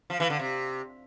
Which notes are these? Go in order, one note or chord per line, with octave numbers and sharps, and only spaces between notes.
F3
E3
D3
C3